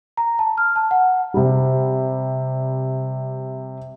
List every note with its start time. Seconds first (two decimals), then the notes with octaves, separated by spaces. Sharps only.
0.17 A#5
0.39 A5
0.58 F6
0.76 A5
0.91 F#5
1.34 C3 G3